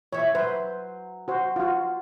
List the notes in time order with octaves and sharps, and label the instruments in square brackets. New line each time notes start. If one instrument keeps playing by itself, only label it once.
[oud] E3 G3 E5 [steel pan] C#5
[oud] F#3 [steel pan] B4 C5
[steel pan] F#4 C5
F4 F#4